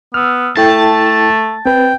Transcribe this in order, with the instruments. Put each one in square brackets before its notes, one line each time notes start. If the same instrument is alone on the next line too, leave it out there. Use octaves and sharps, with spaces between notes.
[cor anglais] B3 [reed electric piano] E6 F6
[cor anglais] A3 [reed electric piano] E4 A4 G5 [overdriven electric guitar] A5
[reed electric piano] C4 B4 [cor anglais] G5